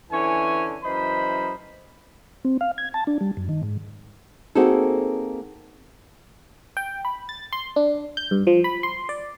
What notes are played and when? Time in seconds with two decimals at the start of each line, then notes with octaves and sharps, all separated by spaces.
0.11 D3 E3 C#4 C#5 G#5
0.83 F#2 E3 C5 D#5 B5
2.45 C4
2.61 F5
2.78 G#6
2.94 A5
3.07 D4
3.21 G3
3.37 F#2
3.49 D#3
3.63 G#2
4.55 A#3 C4 D#4 F#4 G#4 A4
6.77 G5
7.05 B5
7.29 A6
7.52 C6
7.76 D4
8.17 G6
8.31 G2
8.47 F3
8.64 B5
8.83 C6
9.09 D5